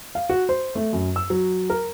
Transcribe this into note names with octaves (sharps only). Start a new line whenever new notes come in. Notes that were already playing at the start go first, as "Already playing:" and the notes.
F5
F#4
C5
A3
F#2
E6
F#3
A#4